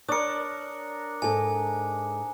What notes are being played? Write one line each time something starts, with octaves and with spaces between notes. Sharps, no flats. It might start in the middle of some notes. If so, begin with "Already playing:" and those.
D4 A#4 C#5 D#6 C#7
G#2 A4 G#5